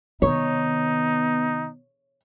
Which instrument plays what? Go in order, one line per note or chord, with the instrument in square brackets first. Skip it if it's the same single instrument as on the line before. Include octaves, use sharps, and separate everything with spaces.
[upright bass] C3 D#3 [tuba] B3 [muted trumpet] D#4 [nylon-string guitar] C#5